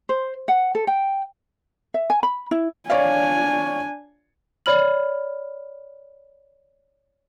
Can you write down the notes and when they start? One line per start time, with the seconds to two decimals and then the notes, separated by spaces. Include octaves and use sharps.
0.09 C5
0.48 F#5
0.75 A4
0.87 G5
1.94 E5
2.10 G#5
2.23 B5
2.51 E4
2.90 D4 C#5 D5 F5 G#5
4.66 C#5 D5 B5 F6 F#7